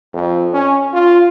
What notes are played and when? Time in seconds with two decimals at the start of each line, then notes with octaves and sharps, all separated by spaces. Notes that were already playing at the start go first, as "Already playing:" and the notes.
0.14 F2
0.54 C#4
0.93 F4